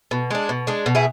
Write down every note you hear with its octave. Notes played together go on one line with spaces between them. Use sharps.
B2
G#3 D4
B2
G#3 D4
B2
E4 G#4